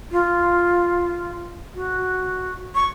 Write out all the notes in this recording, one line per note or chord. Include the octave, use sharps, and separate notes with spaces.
F4
F#4
C#6